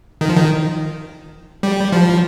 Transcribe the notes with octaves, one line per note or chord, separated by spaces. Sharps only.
D#3
F3
D#3
G3
F3